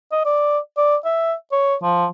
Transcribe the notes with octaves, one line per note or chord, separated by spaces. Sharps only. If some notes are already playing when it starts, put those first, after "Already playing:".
D#5
D5
D5
E5
C#5
F3